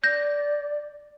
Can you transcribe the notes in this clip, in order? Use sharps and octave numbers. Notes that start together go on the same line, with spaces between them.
D5 G6 A#6